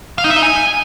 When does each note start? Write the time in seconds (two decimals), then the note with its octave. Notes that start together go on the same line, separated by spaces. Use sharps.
0.18 F5
0.24 D#4
0.30 E5
0.36 D#4
0.42 G#5